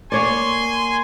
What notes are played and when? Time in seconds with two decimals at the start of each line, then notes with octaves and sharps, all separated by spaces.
0.12 A#3 C#5 D5 G#5 C6